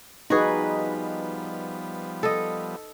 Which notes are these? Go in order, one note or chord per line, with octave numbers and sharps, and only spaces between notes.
F3 G3 B3 D#4 F#4 G#4 B4
A4 D#5